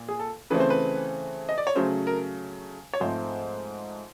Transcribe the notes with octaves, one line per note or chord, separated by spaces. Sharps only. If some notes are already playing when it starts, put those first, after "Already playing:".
Already playing: A#2
G#4
A4
C#3 E3 A3 C4 B4
C5
B4
D#5
D5
C#5
C#3 F#3 A3 C5
A#4
C#5
G#2 F3 A3 C4 C5